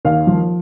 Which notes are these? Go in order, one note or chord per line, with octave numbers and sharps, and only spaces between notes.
D#2 F5
F3